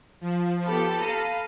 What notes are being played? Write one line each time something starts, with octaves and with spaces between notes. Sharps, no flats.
F3
B3 G4 A4 B5
F5 A#5 B5 D#7